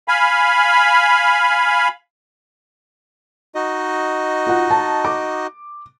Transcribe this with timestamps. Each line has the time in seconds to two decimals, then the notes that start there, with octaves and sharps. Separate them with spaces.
0.08 F5 G#5 B5
3.55 D#4 F#4 D#5
4.47 F4 F#5
4.71 A5
5.05 D6